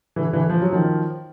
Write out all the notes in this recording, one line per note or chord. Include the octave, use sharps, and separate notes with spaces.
D3 E3
D3 E3
F3
F#3
D#3 F3